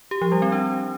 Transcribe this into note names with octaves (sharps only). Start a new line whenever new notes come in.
G4
F3
G3
C4
D4